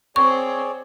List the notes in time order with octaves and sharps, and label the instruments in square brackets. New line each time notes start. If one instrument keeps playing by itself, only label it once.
[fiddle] C4 [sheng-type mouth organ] G#4 C#5 D5 [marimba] C#6